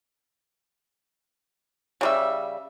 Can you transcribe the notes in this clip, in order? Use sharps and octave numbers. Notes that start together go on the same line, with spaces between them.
C#3 G3 E5